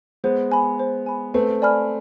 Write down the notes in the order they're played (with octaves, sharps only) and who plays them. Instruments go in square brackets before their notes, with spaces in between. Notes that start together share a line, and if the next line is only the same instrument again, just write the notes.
[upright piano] G#3 B3 [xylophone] C5
[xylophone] G#5 B5
C5
G#5 B5
[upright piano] A3 C4 [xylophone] B4
[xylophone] D5 G#5 B5 F6